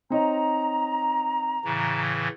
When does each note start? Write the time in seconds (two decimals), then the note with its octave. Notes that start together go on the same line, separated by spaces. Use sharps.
0.10 C4 D#4 C#5 A#5
1.65 A2 C#3 E3